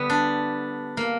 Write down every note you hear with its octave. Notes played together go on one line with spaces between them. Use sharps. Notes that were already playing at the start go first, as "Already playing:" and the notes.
Already playing: D3 G3 B3
D4
A#3